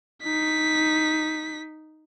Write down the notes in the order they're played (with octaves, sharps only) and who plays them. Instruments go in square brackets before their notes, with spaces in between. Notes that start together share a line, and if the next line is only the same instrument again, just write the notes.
[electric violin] D#4 B6